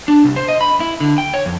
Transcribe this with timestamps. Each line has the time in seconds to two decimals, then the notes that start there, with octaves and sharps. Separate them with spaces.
0.08 D4
0.24 C2
0.36 C5
0.48 D#5
0.61 B5
0.80 E4
1.00 D3
1.18 G5
1.34 C#5
1.46 F2